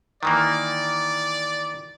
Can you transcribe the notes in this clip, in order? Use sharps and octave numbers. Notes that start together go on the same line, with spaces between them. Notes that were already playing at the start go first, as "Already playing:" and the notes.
D#3 E3 A#3 D5